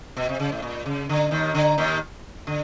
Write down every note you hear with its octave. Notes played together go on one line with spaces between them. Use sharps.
B2
C3
C#3
A2
A#2
C#3
D3
D#2 D#3
D3
D#2 D#3
D3